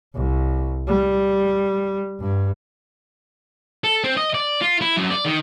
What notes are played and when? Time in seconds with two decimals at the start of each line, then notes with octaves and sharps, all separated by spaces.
0.15 C2
0.88 G3
2.20 G2
3.84 A4
4.04 C4
4.17 D#5
4.34 D5
4.61 F4
4.81 E4
4.97 F#2
5.10 D5
5.25 D#3